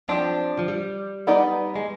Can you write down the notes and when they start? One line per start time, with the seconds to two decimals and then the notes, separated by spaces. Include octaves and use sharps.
0.09 F3 C4 D4 G4
0.59 F3
0.68 G3
1.27 B3 D#4 B4 D5
1.76 G#3